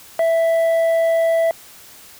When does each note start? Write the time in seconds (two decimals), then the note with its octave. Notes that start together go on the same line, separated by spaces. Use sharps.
0.19 E5